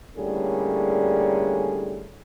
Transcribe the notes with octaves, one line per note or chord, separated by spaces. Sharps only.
A2 D3 G3 A#3 C#4 G#4